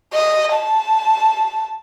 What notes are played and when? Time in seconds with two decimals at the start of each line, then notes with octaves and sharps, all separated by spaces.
0.13 D#5
0.54 A5